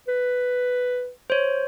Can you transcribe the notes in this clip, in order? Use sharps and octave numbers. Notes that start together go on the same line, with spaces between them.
B4
C5 C#5